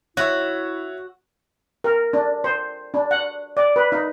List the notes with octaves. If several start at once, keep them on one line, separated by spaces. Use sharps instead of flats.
E4 F#4 C#5 E5 E6
A#4
D4
C5
D4
F#5
D5
B4
D#4